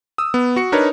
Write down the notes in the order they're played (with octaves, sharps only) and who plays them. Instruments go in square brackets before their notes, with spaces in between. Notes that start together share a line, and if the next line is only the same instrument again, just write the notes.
[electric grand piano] D#6 E6
B3
F#4 C#7
D4 D#4 A#4 B4 C#5